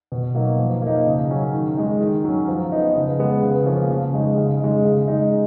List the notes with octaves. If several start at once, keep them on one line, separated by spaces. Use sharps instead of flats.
B2
F#3 A#3 D#4
F3
A#3 D#4
C#3
F#3 C#4
D#3
G#3 D#4
D#3
F#3 C#4
F3
B3 D#4
C#3
G#3 B3
C#3
F3 A#3 C#4
C#3
G#3 D#4
C#3
G#3 D#4
C#3
G#3 D#4